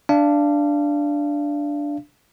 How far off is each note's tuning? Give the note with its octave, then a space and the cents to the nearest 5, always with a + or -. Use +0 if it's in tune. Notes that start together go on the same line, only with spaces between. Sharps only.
D4 +0 F5 -30